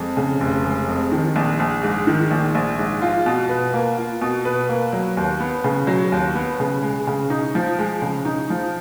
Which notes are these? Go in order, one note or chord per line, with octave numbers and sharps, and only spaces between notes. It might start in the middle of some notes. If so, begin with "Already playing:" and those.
Already playing: F2 G#3
C#3
F1
G#3
F2
D#3
A#1
A#1
G#2
D#3
A#1
A#1
G#2
F4
B2
B4
A#3
F4
B2
B4
A#3
F#3
D#2
B3
C#3
F#3
D#2
B3
C#3
G#3
C#3
D#4
F3
G#3
C#3
D#4
F3